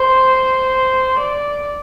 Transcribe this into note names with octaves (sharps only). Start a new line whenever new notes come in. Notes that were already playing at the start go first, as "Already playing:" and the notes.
Already playing: C5
D5